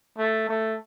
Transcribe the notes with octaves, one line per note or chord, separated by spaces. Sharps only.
A3
A3